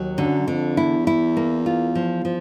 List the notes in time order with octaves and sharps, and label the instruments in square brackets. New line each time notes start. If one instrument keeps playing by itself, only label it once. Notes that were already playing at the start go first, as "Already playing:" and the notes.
Already playing: [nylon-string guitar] D#2 F#3
[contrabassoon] F#2 [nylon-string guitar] D3
[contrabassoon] F2 [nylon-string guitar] D3
[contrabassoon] E2 [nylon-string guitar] E4
[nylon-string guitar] E4
A#3
F4
F3
F3